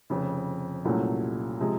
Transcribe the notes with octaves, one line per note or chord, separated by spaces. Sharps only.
F1 F2 C#3
C2 A#2 F#3 A3 C#4
C3 F3 G#3